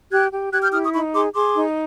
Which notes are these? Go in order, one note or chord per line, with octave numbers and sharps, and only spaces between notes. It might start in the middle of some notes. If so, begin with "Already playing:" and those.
G4 F#6 G#6
G4
G4 F#6 G#6
F6 G6
E4 D#6 F6
C#6 D#6
D#4 B5 C#6
G#4 C6 D6
G#4 C6 D6
D#4